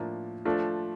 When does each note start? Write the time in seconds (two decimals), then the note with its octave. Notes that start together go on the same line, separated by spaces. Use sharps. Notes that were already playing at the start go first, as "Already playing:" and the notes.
Already playing: A2 F3 A#3 D4
0.45 F3 A3 D4 F4